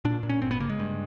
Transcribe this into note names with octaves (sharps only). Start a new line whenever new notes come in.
A#2 D4
A#2
C#4
G1 C4
B3
C#3 A#3
G#3
G2